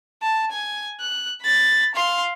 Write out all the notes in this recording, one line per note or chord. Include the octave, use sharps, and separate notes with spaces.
A5
G#5
F#6
B5 A6
F5 C6